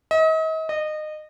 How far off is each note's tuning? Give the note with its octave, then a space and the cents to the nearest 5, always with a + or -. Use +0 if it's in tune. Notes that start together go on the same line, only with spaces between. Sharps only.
D#5 +40
D#5 -25